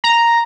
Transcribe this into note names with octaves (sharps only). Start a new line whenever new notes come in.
A#5